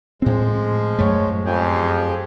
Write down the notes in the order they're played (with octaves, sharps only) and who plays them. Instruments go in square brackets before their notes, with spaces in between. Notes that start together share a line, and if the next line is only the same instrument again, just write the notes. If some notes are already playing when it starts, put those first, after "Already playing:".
[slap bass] A2 C4 [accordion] F3 G#3
[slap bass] F#2 A3 [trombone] C#5
[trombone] F2 [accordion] G4 G#4